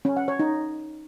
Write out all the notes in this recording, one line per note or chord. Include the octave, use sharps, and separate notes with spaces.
C#4
F#5
C#5
D#4